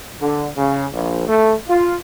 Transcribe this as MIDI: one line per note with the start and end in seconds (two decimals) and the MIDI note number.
0.21 0.48 50
0.57 0.85 49
0.93 1.27 34
1.28 1.53 57
1.68 1.96 65